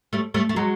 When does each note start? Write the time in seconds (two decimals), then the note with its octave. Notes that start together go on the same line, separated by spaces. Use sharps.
0.13 G3 A3
0.34 G3 A3
0.49 A3
0.56 F#3 G#3